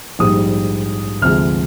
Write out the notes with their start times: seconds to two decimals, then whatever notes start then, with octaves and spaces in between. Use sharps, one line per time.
0.19 A#1 G#2 G3 D#6
1.22 D2 C3 F3 G#3 F6